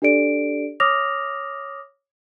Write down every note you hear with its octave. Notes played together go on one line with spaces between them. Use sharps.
D4 G4 A4 D5 D7
C#5 D6 D#6 F6 A#6 F7